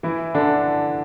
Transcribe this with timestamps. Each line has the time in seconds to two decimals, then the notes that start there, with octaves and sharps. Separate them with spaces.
0.03 E3 E4
0.34 D3 D4